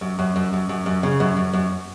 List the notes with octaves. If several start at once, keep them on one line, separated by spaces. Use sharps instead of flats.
F#2
F#2
F#2
F#2
F#2
F#2
C#3
F#2
F#2
F#2